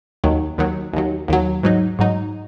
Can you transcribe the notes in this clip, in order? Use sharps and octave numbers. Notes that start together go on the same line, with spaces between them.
D#2 D#3 F#3
D#2 D#3 F#3
D#2 D#3 F#3
D#2 D#3 F#3
G#2 F#3 D#4
G#2 F#3 D#4